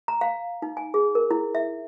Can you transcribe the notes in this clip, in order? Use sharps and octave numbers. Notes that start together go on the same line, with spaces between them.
A#5
F5
D#4
G#5
G#4
A#4
E4
E5